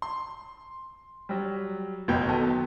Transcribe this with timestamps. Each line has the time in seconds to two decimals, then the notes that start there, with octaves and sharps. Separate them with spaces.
0.02 C6
1.29 F#3 G3
2.08 F#1 B1 G5
2.28 D#3 B3 A4